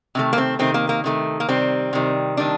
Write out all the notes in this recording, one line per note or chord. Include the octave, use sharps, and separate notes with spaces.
C3 D#3 A3
A#3
C4
C3 D#3 A3 C4
A#3
A#3
C3 D#3 A3
A#3
C3 D#3 G3 C4
C3 D#3 G3
C3 D#3 G3 D4